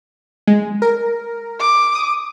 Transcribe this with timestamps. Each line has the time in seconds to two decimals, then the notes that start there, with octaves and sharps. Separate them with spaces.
0.47 G#3
0.82 A#4
1.60 D6
1.95 D#6